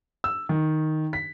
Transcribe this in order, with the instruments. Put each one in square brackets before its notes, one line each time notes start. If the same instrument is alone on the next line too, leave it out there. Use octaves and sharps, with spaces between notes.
[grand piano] E6
D#3
B6